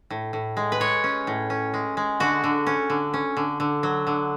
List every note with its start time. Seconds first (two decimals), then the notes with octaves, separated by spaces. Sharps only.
0.11 A2
0.33 A2
0.57 G#3
0.72 B4
0.80 G#3 C#5
1.04 C#4
1.27 A2
1.50 C#4
1.74 G#3
1.97 G#3
2.20 D3 F#4
2.44 D3
2.67 C#4
2.90 D3
3.14 C#4
3.37 D3
3.60 D3
3.83 F#3
4.07 D3